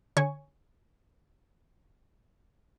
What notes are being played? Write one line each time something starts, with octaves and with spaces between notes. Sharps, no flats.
D3 C#5 G#5 C#6